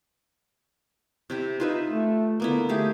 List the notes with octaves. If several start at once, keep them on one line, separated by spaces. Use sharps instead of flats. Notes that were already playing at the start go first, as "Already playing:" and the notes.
C3 E4 G4
D#4 F4 B4 E5
A3
D3 A#3 B3 E4
A3 D#4 G4 G#4